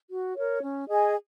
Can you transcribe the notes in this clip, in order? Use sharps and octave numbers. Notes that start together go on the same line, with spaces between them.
F#4
A#4 C#5
C#4
G#4 D#5 G#5